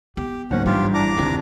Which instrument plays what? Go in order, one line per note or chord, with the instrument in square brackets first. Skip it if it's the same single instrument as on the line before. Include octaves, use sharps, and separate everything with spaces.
[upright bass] B3 [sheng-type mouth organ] G4
[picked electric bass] C#2 A#3 [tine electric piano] G#2 F#3 C5 [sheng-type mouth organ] C#4 F#5
[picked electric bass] A1 G2 [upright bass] G3 [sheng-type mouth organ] F4 G4
[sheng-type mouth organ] D4 A#5 D6 [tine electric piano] E4
[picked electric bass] F#1 D#2 C3 [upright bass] D#3 F4